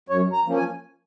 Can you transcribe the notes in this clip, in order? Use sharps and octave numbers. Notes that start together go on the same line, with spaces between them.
F#2 C#5
A#5
F3 A#3 C#4
G#5